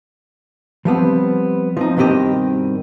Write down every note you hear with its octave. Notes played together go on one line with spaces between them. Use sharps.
F3 G3 B3 C4
F3 C4 D#4
G2 B2 D#3 C4 G4 D#5